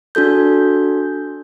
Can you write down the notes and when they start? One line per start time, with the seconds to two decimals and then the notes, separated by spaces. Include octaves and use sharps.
0.15 D4 F#4 A4 G6